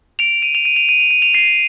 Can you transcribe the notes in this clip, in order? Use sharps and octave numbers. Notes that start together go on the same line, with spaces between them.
D7 F7
D#7
F7
D#7
F7
D#7
F7
D#7
F7
C7 D#7